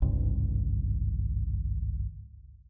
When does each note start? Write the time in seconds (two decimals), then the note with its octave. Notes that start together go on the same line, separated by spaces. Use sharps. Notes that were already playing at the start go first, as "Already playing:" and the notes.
0.02 G#1 C#2 G2 C3